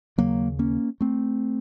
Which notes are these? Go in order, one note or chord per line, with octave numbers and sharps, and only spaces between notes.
D#2 C#3 F#3 A#3
A#3 C#4
A3 C4